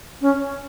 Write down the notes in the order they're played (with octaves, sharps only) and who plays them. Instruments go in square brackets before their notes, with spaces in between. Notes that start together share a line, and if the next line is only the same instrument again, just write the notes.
[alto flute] C#4